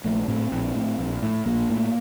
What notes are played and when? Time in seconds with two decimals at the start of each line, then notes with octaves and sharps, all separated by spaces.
0.04 A#1 A3
0.28 A2 C4
0.52 A#1
0.75 A2
0.99 A#1
1.22 A2
1.46 A#1 A#3
1.70 A2